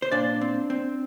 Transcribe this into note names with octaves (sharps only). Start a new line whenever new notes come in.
C5
A#2 D4 D5
C4
C4